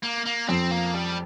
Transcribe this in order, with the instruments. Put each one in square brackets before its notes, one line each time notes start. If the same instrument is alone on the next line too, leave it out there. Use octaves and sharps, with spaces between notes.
[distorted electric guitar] A#3
A#3
[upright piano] F2 [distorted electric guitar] C4
[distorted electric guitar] A#3
G3